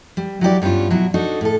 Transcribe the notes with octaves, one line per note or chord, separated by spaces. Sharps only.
G3
F#3 E4 G4 D5
G2 G3 B3 C#4 F4
B2 F#3 E4
D4 D#4 F#4 A4
A2 A4